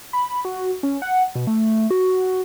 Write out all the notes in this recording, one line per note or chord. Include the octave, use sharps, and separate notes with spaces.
B5
F#4
C#4
F#5
B2
A3
F#4